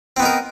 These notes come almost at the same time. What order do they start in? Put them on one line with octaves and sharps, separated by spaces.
C4 B3 D#4 A#4